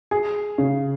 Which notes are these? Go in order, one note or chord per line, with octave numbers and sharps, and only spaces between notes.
G#4
C#3